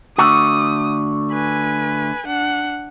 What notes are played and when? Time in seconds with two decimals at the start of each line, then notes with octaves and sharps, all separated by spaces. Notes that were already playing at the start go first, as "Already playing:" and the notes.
0.18 D3 A3 F#4 D#6
1.33 B4 G#5
2.27 D4 F#5